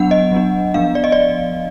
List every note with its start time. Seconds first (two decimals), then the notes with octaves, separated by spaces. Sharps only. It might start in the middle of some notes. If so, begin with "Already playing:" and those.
Already playing: F#3 B3 D4 F#5
0.11 D#5
0.32 F#3 B3 D4
0.74 F3 B3 D4 F5
0.95 D5
1.04 D#5
1.12 D5